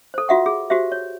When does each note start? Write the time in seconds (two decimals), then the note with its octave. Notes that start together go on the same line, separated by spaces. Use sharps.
0.14 A4 C5
0.28 F4 F#4 E5 F#5 C#6
0.46 G#4
0.70 F#4 G4 C5 E5
0.92 C#5